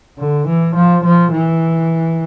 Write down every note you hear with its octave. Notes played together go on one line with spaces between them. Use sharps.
D3
E3
F3
F3
E3